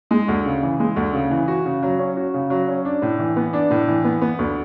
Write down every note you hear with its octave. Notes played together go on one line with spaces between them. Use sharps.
G#3
D2
C#3
E3
G#3
D2
C#3
E3
F#4
C#3
F#3
C#4
F#4
C#3
F#3
C#4
D4
A2
E3
B3
D4
A2
E3
B3
B3
D2